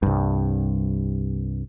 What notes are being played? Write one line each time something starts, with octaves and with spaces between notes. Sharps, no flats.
C2 G2